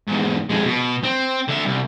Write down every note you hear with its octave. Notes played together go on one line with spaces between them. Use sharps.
E2 G#2
F2 G#3
B2
C4
D3 E5
C2